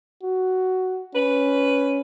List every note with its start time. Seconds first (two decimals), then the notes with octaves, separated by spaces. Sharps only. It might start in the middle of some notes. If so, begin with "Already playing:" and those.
0.23 F#4
1.15 C#4 B4